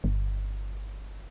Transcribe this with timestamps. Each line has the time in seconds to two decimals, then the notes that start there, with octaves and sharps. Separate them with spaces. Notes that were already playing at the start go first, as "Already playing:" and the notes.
0.04 G1